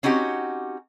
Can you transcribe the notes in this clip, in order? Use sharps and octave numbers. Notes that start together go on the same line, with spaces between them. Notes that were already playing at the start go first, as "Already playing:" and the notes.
C4 C#4 D#4 F#4 G4